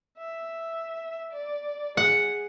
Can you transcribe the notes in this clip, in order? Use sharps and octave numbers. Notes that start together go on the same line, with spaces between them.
E5
D5
G#4 F#5